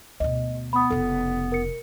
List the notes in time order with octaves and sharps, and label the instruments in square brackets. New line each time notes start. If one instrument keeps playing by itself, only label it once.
[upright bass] D2 B2 [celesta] D#5
[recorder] B3 [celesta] B5 D#6
[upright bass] F1 C#3 [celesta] A4
[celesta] A#4 C#7